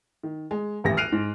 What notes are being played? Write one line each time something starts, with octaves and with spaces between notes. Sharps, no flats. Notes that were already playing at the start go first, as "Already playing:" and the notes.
D#3
G#3
D#1 A1 E3 G4 A#6
F6 F#6 C7 D7 D#7 F7
G#2